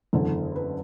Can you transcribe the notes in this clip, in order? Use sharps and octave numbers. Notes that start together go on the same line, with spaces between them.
F#1 E2 D3 A4
B4